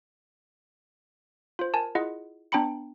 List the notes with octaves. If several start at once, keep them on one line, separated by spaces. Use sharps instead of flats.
F4 C5
A#4 G#5 A5
E4 F4 G#4 D#5 F#5
B3 D4 G5 A#5 B5 C#7